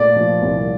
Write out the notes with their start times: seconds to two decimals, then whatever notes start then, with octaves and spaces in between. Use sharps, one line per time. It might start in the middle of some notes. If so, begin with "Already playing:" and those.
Already playing: A#2 A3 D5
0.16 F3
0.42 C2